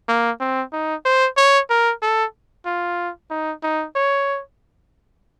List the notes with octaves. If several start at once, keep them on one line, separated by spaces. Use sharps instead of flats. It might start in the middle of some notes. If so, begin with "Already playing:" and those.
A#3
C4
D#4
C5
C#5
A#4
A4
F4
D#4
D#4
C#5